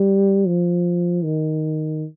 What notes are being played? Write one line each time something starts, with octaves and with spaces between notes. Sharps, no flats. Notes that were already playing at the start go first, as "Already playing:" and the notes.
Already playing: G3
F3
D#3